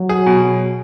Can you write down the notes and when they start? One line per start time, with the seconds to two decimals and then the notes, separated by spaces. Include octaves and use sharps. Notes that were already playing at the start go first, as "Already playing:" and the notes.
Already playing: F#3
0.09 G#4
0.26 B2